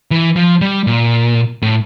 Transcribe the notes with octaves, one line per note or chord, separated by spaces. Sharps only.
E3
F3
G3
A#2
A2